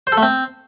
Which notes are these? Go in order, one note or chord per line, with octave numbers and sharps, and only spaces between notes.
C5
A4
A3
C4